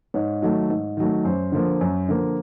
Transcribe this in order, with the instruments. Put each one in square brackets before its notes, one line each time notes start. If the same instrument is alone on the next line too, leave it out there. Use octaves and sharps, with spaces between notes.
[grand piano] G#2 C#5
D#3 F#3 A3
G#2
D#3 F#3 A3
F#2 C5
D3 F3 A#3
F#2
D3 F3 A#3